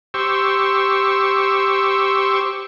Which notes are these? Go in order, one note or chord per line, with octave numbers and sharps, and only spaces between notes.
G4 C5 C#6 E6